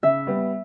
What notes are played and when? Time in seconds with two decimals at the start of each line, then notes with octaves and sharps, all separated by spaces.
0.03 C#3 E5
0.27 G3 B3